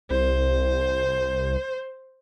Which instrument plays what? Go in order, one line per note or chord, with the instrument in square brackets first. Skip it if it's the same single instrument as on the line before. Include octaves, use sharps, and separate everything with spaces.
[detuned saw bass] C2 [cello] C5